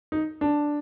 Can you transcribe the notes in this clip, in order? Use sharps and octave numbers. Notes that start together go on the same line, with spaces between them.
D#4
D4